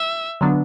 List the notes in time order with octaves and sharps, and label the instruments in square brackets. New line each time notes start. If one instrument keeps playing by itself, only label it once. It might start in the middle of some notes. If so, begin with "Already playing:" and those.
Already playing: [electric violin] E5
[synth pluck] D3 F#3 B3 D4